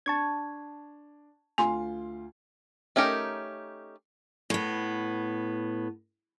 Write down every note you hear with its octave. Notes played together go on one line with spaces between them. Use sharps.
D4 A5 C#6 G#6
D2 F4 G#5 C6
A3 C#4 D#4 G4 A#4
A2 B3